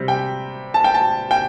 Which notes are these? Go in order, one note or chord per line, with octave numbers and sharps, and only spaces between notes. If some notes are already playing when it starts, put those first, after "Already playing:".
Already playing: C3 G3
G5
A5
G5
A5
G5